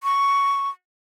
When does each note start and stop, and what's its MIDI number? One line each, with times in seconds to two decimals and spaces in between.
0.03 0.70 85